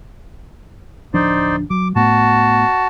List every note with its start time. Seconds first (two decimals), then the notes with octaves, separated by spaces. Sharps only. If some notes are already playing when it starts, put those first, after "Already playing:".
1.14 D1 F3 D4 D#4 C5 D5
1.70 F#3 D6
1.96 A2 A3 B3 F#4 A5